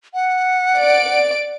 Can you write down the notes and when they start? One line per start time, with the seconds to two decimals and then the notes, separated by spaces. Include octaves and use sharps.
0.14 F#5
0.77 D5 D7